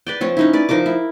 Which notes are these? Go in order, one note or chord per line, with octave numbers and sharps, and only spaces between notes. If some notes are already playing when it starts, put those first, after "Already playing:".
B4 D5 G5
F3 C4 C#5
C#4 D#4 E4
B4 D5
F3 D#4 A#4 D6
E4